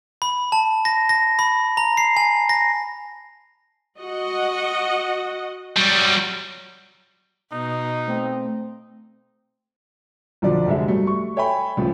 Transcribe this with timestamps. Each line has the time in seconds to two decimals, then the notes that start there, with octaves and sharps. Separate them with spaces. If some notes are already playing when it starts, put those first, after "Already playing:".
0.22 B5
0.52 A5
0.85 A#6
1.09 A#6
1.39 B5
1.77 A#5
1.97 C7
2.17 G#5
2.49 A#6
3.99 F#4 D#5 F#5
5.77 F#3 G3
7.52 B2 D#4
8.08 A3 C4
10.42 B1 F2 D3 F3 D5
10.67 F1 D3 G3 G#3 E5
10.88 G2 F#3 G3 A3
11.07 C#6
11.36 A4 C#5 E5 G5 G#5 B5
11.77 C#2 A2 F3